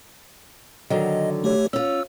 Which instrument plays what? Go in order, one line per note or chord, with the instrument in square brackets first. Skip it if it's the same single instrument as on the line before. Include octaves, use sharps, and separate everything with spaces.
[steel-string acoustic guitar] D3 D#3 F#3 [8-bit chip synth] D#5
[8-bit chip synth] A3 G4 C#5
[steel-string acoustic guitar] C#4 F4 [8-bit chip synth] E6